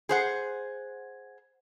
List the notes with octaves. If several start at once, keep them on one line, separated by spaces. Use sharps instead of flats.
G#4 C5 F#5